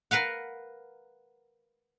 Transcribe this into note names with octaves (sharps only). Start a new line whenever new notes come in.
A#4 B4 F5 F#5